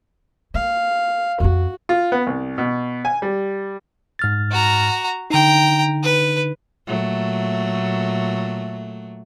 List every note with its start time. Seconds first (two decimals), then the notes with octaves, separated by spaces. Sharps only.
0.54 A#3 F5
1.40 F2 C#4 F#4
1.89 F4
2.12 B3
2.27 C2
2.58 B2
3.05 G#5
3.22 G3
4.19 G#2 F6 A6
4.51 F#4 A#5
5.30 D3 D#4 G5 A#5
6.03 B4
6.87 A#2 F#3 A3